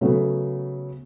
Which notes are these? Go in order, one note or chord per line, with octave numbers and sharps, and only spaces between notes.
C#3 F#3 A3 B3